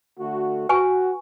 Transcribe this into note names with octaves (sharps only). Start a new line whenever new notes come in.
D3 A3 F#4
F#4 B4 G#5 C#6